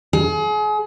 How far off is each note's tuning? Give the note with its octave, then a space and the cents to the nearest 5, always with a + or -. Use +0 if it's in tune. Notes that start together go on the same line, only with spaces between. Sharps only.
G#4 +35